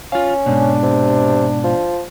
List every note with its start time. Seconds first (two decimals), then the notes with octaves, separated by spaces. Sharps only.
0.12 C#4 F4 F5
0.46 G#2 B2 D4
0.83 C3
1.64 F3